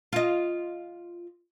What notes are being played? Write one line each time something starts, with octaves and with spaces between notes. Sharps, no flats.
F4 D#5